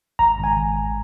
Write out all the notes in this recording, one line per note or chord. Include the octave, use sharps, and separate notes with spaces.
G#1 A#5
G#1
G#5